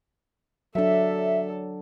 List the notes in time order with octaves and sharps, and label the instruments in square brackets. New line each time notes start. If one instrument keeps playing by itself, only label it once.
[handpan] F#3 D4 [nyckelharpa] A4 [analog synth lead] E5